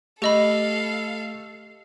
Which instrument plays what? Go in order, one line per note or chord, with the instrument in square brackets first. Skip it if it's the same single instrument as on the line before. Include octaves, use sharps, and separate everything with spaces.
[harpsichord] A3 [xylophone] G4 D#5 B5 [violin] A4 F5